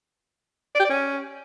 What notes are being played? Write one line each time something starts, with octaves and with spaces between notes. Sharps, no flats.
D5
G4
D5
C#4